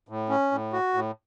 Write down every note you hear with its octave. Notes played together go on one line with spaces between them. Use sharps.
A2
C#4
A2
F#4
A2